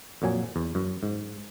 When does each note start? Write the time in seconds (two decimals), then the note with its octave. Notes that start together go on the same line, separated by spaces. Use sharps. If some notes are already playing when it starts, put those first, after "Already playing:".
0.22 F2 A#2 F#3 G#5
0.56 E2
0.75 F#2
1.03 G#2